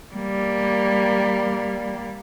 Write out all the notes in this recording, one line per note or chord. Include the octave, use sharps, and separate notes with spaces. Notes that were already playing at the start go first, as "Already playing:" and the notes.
G3 A#3